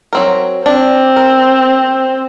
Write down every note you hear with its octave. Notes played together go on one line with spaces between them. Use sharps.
F#3 C4 A#4
C4 D4
A#4